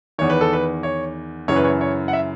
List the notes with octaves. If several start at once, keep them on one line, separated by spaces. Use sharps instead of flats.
E2 D#3 C#5
B4
A4
B4
C#5
F#2 C#3 E3 C#5
B4
C#5
C#5
F#5
E5